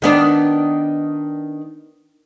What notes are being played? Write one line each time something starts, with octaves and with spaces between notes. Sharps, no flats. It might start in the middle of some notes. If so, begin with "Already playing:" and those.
D#3 B3 D4